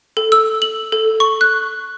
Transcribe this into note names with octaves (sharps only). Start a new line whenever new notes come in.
A4
E6
F#7
A4
C#6
F#6